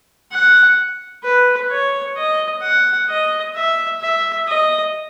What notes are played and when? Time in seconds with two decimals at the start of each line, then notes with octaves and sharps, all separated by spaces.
0.32 F#5
1.24 B4
1.71 C#5
2.16 D#5
2.62 F#5
3.09 D#5
3.55 E5
4.01 E5
4.47 D#5